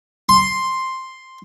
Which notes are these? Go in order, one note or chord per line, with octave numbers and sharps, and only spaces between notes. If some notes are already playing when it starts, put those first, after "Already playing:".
C6